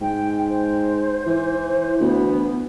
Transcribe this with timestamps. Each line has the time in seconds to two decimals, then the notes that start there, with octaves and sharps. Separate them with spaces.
0.01 G#2 G5
0.49 C5
1.26 E3
2.00 D2 B3